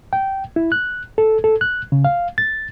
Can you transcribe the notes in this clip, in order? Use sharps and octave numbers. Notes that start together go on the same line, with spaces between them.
G5
E4
F#6
A4
A4
F#6
C#3
F5
A6